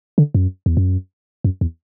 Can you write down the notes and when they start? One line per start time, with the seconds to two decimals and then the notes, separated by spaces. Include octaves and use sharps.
0.18 D3
0.35 F#2
0.66 E2
0.77 F#2
1.44 F#2
1.61 E2